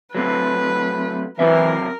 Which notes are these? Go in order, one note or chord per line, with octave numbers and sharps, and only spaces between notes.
F#3 A3 C4 B4
E3 F#3 C4 A#4 E5